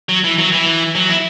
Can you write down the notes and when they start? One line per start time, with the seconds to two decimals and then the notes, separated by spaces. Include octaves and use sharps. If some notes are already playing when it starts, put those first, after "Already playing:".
0.09 F#3
0.24 E3
0.38 F#3
0.52 E3
0.95 F#3
1.09 E4